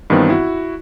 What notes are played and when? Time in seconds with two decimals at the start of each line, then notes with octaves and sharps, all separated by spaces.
0.10 G2 D#3 E3 B3 C4
0.30 E4 F#4